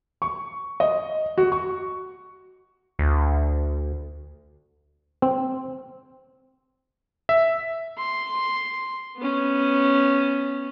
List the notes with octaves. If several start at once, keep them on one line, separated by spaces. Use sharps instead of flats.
C#6
D#5
F#4
C#6
D2
C4
E5
C6
B3 C#4